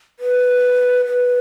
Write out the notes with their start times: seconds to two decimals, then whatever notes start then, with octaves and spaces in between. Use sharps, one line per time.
0.19 B4
1.06 B4